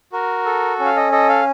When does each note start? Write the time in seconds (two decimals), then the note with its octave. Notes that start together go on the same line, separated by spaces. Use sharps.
0.13 F#4 A#4
0.46 A4
0.80 C#4
0.85 F5
0.96 D#5
1.12 A4 D#5
1.29 F5